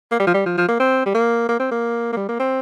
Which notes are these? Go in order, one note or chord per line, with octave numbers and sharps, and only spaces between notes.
A#3
G3
F3
G3
F3
F3
A#3
C4
G3
A#3
A#3
C4
A#3
A#3
G3
A#3
C4